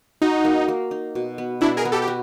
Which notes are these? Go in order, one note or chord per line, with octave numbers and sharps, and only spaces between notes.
D#4 F#4
A#3
A#3
D#4
B2
B3
B2 D4 E4
G#4 A#4
B3
G4 A4
G4
F#4